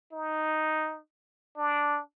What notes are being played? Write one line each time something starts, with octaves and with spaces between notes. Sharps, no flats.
D#4
D4